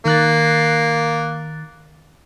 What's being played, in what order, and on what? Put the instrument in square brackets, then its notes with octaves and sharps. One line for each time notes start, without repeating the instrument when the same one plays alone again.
[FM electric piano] D#3 F#6 A6 [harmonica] A#3